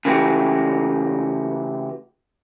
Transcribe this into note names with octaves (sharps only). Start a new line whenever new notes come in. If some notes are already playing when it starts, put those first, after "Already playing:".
C#3 E3 A3 F#4 G4